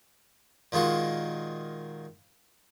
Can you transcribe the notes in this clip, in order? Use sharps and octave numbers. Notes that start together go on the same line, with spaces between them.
A#2 D#3 G#3 F4 F#4